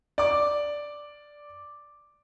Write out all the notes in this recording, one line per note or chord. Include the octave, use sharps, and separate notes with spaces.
D5 D6